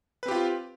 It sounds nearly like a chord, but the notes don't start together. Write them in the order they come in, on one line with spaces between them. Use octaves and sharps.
B4 C4 G4 F4